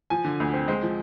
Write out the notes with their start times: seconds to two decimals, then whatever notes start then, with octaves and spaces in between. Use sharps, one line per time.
0.10 F3 G#5
0.25 D3
0.40 D2
0.54 C4
0.68 G#3 C5
0.83 F3